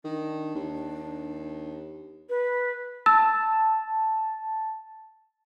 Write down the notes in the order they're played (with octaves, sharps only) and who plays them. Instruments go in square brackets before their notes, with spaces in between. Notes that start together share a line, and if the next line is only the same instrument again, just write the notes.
[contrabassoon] D#3 [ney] D4
[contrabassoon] D#2
[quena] B4
[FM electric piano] A5 [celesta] E6